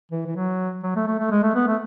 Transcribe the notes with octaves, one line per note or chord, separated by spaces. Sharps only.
E3
E3
F#3
F#3
A3
A3
A3
G#3
A3
B3
A3